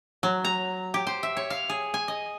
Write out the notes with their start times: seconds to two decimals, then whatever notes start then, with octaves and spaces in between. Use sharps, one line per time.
0.23 F#3
0.45 A#5
0.94 G4
1.07 C5
1.23 E5
1.37 C#5
1.50 F5
1.69 G#4
1.94 G#5
2.08 D#5